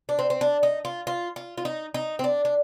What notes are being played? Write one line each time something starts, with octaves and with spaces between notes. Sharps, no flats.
D4
C4
C4
D4
D#4
F4
F4
F4
F4
D#4
D#4
C4
D4
D4